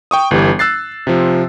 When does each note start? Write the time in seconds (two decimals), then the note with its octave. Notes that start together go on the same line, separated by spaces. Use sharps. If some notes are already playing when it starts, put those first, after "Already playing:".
0.11 G5 C#6 D#6
0.31 G1 E3 G3
0.59 E6 F#6 A6 C7
1.07 C3 F3